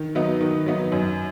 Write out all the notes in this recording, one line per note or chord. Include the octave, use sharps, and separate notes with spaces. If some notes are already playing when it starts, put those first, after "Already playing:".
Already playing: D#3
F#3 B3 D#4
D#3
F#3 B3 D#4
F#2